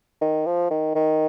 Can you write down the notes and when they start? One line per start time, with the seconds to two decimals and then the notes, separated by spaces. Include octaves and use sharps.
0.21 D#3
0.46 F3
0.71 D#3
0.95 D#3